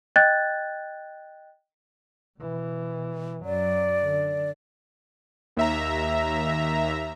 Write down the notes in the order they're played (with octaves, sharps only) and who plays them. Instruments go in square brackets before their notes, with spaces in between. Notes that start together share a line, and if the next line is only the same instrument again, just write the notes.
[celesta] D#5 G5 F#6 G#6 A6
[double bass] B2 E3
[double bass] F#2 F#3 [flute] D5
[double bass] D3
[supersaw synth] D#2 E5 A#5